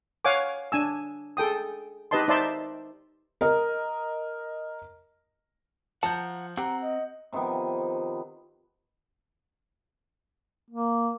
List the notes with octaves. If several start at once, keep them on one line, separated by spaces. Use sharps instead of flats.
C#5 F5 F#5 G#5 D6
D4 G#5 E6
G#4 A4 G5 D#6
D#4 G4 B4 D#5 A5 C6
D#4 C5 D5 E5 A5 C6
A#4 D#5
F3 F#5 A5 A#5 G6
C4 G4 F#5 A#5
D#5
C3 D#3 F3 B3
A#3